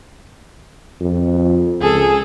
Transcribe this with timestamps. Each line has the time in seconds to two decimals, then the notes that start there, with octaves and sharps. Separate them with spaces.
1.01 F2
1.81 C#2 G#4 A4